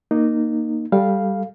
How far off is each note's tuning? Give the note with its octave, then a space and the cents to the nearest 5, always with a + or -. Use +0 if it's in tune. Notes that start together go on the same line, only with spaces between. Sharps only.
A#3 +0 D#4 -15
G3 +0 A4 +0 F5 +0